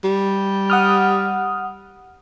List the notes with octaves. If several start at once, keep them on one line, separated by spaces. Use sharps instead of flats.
G3
F#5 D#6 F6